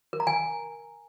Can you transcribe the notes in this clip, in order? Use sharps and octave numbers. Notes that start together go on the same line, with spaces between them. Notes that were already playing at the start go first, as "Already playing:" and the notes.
A#4
A#5
G#5